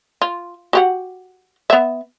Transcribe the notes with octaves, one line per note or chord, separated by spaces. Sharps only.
F4
F#4 G4 F#5
B3 E5